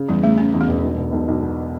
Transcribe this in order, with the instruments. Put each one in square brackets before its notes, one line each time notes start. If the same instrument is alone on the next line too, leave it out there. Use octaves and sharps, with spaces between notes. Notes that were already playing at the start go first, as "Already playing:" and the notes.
Already playing: [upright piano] C#3
[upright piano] E2 [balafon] G3
[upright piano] C#3 [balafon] A3
[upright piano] C#3 [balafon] C#4
[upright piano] E2
[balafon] B3
[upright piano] E1
B1
B2
B1
B1
B2